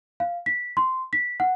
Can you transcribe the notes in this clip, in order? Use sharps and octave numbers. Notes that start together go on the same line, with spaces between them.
F5
B6
C6
B6
F#5